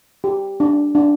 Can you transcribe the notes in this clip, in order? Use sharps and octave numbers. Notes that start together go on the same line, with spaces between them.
G4
D4
D4